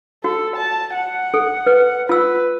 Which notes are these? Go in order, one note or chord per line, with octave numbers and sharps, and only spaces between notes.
F#4 A4
A5
F#5
A4
B4
F4 B4 E6